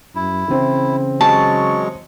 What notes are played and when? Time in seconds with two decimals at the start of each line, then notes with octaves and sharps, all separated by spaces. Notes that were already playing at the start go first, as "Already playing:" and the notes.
0.16 F#2 E4
0.48 C#3 E3 C4
1.21 F#3 G#3 A5 C#6